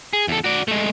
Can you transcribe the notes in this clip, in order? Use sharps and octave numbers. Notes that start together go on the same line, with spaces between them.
G#4
E2 A4
F#4 D5
G#3 A3